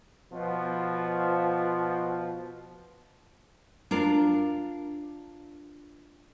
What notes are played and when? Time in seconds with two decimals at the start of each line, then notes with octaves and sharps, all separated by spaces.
0.32 B2 F3
3.91 D4 F4 A#4